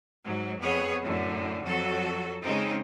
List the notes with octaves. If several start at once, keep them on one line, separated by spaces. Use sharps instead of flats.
G#2 F#3
F2 B3 G#4 C#5
F#2 A2 D3
F2 F#3 F#4 A4
C#3 G#3 C4 D#4